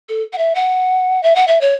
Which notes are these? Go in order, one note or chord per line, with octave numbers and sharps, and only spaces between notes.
A4
F#5
E5
F#5
E5
F#5
E5
C#5